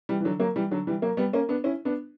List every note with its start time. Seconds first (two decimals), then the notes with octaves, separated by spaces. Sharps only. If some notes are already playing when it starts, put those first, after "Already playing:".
0.09 E3 G3
0.21 E3
0.25 D3 F#3
0.40 F#3 A#3
0.56 E3 G3
0.71 D3 F#3
0.87 E3 G3
1.02 F#3 A#3
1.17 G3 B3
1.33 A#3 C#4
1.49 B3 D4
1.64 C#4 E4
1.85 B3 D4